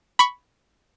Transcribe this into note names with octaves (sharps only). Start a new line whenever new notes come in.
B5 C#6